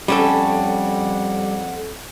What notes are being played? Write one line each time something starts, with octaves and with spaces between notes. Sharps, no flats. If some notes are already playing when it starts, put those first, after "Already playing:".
F2 G3 C#4 A4 F#5